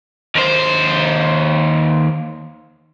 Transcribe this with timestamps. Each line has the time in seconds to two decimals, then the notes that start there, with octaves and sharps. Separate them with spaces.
0.35 D#2 C5